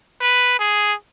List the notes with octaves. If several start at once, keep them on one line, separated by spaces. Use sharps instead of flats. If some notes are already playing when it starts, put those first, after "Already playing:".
B4
G#4